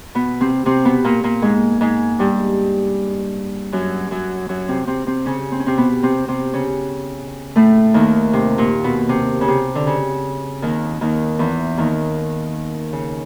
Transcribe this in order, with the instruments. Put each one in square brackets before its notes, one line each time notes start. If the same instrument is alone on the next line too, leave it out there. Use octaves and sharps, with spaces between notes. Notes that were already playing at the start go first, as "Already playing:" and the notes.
[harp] B2 B3
C3 C4
C3 C4
B2 B3
A#2 A#3
A#2 A#3
G#2 G#3
G#2 G#3
G2 G3
F#2 F#3
F#2 F#3
F#2 F#3
C3 C4
C3 C4
C3 C4
C#3 C#4
C4
C#4
C3 C4
B2 B3
C3 C4
C3 C4
C#3 C#4
A2 A3
D#2 D#3
C3
A#2
B2
C3
C#3
C3
D3
C#3
D#2 D#3
D#2 D#3
E2 E3
D#2 D#3
C#3